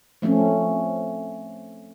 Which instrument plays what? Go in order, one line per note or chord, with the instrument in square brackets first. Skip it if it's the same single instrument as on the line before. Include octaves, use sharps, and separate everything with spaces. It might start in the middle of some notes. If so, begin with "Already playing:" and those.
[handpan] F3 A3 C4 C#4